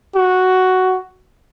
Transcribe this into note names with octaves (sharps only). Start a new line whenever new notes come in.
F#4